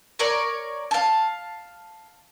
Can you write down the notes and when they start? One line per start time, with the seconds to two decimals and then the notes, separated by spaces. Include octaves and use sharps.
0.19 A#4 C#5 D5
0.91 F5 A5